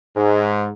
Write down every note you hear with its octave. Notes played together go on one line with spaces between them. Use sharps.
G#2